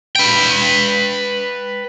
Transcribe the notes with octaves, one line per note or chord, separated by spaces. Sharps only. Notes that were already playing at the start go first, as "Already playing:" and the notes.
B4 G5